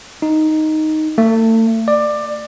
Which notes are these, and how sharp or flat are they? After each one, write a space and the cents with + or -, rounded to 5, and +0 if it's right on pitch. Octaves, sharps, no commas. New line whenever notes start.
D#4 +0
A3 +35
D5 +20